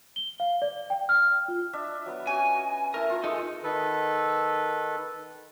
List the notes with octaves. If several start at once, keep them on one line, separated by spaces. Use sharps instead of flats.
G7
F5
D5
G5
F6
F4
D4 D#5 E5
F#3 B3 B4
C#4 F#4 F5 G#5
A3 E4 A#4 A5
F4
G#3 D#4 A4
D#3 A4 B4